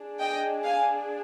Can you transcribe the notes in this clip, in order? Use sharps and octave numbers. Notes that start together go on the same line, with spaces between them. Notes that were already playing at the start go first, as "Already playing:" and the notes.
Already playing: D4 G#4
D#5 G5
F5 G#5